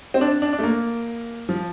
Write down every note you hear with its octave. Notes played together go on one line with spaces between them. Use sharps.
C4
D4
D4
D4
A3
A#3
F3